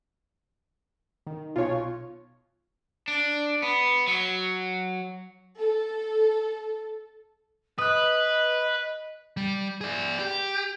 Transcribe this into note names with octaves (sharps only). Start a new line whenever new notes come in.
D#3
B1 B2 F4 C#5
D4
B3
F#3
A4
B4 D#5 D#6 F#6
G3
G#4 D5
G4